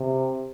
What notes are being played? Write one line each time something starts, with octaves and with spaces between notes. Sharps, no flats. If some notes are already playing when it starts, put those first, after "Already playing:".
Already playing: C3